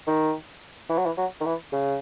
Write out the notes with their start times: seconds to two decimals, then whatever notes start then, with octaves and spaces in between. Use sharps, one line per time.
0.07 D#3
0.89 E3
0.98 F#3
1.06 E3
1.18 F#3
1.41 D#3
1.46 E3
1.73 C#3